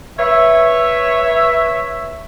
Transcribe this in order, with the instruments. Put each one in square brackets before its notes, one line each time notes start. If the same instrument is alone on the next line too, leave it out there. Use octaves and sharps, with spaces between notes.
[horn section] B4 C#5 E5